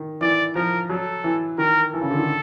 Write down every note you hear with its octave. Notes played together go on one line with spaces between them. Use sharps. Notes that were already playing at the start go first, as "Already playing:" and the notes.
Already playing: D#3
E3 D5
F3 A#4
F#3 A4
E3
D#3 A#4
E3 A4
C#3
D3
D#3